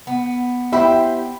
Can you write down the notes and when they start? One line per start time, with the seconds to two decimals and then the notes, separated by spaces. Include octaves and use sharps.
0.07 B3
0.73 E4 G4 C5 E5 G5 B5